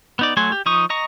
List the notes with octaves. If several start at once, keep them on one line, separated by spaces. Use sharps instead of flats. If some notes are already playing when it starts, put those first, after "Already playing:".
B3 D#4 D5
F#3 A3 F#4 G#5 C6
G4
F3 D#4 C#6 D#6
D#5 A#5 C#6